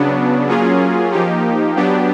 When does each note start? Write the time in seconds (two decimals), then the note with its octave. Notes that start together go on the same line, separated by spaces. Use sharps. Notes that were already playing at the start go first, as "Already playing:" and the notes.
Already playing: C#3 F#3 B3 D4
0.48 F#3 A#3 C#4 F4 G#4
1.12 F3 A#3 D#4 G4
1.76 F#3 B3 D4 G4